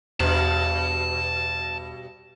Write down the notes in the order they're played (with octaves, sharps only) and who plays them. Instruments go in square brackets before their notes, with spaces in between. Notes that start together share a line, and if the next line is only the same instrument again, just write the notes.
[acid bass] E2 [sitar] G2 B2 [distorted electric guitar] A5